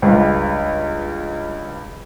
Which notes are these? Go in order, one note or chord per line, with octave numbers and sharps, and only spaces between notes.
C#2 G2